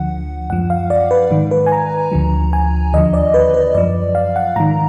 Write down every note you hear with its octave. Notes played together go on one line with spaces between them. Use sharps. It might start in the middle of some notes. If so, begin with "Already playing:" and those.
Already playing: D2 D3 F3 F#5
F#2 F3 F#5
F5
D5
B4
G#2 D#3
B4
G#5
A#5
D2 D3 F3
G#5
D#2 D3 F3 D#5
D5
B4
B4
F#2 F3 D5
F5
F#5
G#2 D#3 A#5